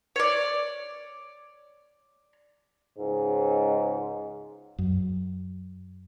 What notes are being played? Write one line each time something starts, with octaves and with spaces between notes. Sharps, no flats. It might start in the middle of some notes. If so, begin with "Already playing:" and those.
C#5 D5
C#2 G#2
F#2